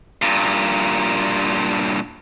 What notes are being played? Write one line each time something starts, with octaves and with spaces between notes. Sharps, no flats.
G2 A#2